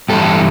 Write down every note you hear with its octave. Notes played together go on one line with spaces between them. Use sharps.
G2 E3 A4